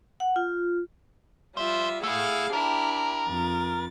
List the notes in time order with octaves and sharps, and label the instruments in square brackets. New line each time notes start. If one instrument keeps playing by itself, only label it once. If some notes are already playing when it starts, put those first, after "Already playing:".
[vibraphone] F#5
F4
[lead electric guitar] F3 C5 [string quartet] G3 F4 E5
[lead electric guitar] A3 E4 [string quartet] G#4 F5 F#5
[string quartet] D4 E4 G4 [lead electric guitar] A#4
[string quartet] F2 A6